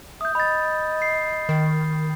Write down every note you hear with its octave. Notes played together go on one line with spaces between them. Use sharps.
E5 D#6 G6
D#5 B5 A6
C7
D#3